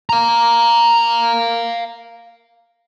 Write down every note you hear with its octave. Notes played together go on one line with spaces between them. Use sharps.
F5 A#5